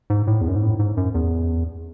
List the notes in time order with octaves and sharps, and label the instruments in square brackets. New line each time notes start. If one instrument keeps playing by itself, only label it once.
[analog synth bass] G#2
A2
E2
F#2
G#2
A2
G#2
F#2
E2